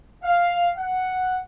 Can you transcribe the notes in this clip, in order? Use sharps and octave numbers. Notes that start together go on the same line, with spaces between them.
F5
F#5